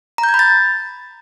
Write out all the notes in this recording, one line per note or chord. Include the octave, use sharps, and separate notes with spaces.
A#5
G6
G#6
B5
A6